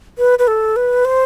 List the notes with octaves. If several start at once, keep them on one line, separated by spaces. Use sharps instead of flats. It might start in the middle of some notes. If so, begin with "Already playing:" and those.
B4
B4
A4
B4
C5